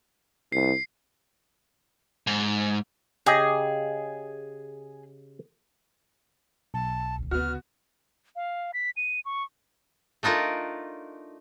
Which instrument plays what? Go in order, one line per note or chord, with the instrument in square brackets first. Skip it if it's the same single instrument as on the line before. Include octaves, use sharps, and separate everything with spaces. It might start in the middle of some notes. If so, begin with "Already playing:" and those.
[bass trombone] C2 [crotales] C7
[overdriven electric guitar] G#2
[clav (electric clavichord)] C#3 G4 D#5 [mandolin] G#4
[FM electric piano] B1 [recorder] A5
[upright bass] C#2 D#3
[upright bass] D2 C#3 [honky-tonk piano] B3 F#4 [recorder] F6
[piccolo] F5
B6
D#7
C#6
[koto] A3 D4 D#4 F4 A#4